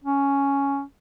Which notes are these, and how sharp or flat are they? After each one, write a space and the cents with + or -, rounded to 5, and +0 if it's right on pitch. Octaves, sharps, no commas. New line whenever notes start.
C#4 +5